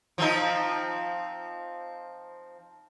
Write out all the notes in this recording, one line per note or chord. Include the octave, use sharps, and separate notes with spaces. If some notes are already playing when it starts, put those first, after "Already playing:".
F3 C4 D#4